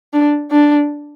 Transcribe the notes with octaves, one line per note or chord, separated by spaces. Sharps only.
D4
D4